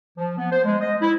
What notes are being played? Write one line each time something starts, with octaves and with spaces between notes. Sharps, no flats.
F3
B3
C5
G#3
D#5
E4